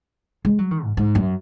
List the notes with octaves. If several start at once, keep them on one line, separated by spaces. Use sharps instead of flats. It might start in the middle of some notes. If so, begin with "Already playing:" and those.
G#3
F#3
D#3
G#2
G#2
F#2